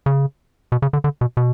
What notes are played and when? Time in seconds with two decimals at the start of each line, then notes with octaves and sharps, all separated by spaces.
0.06 C#3
0.72 B2
0.82 C#3
0.93 D3
1.04 D3
1.21 B2
1.37 B2